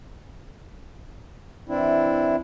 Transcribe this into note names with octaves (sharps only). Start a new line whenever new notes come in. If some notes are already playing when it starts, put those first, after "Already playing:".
E3 C4 D4 E4